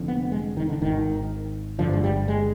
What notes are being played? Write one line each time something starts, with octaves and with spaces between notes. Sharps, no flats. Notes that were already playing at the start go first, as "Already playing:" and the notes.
Already playing: F1 F2 D3
B3
G#3
D#3
D3
G#1 G#2 D#3
G1 G2 D3 F3
G#3
G3
G#3